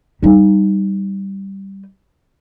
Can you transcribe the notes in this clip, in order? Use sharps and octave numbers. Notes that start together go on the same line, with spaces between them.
G3 D#4